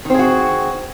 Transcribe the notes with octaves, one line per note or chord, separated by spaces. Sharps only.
D#3 C4 F#4 G#4